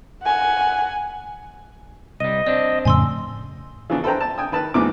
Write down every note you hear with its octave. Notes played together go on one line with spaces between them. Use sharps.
F#5 G#5
C2 G3 D#5 D#7
C4 D4 D5
F2 A2 C#3 G#5 C6 E6
C#3 E3 F3 B3 D4
A4 B4 C5 G5 A#5
A5
G5 G#5 D#6
D#3 B4 A5
D#2 G#2 E3 F3 B3 D6